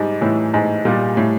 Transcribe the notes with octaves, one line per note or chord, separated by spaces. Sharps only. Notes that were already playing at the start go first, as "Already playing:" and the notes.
Already playing: G#2 G3
A2 E3
G#2
A#2 G3
A2